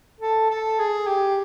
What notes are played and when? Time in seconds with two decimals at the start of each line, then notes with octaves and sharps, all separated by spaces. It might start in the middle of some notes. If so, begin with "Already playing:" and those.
0.20 A4
0.50 A4
0.79 G#4
1.07 G4